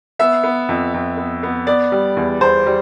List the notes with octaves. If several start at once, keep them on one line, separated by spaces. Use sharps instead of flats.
B3 E5
B3
F2
F2
B3
B3
B3 D5
G3
E2
E2 C5
G3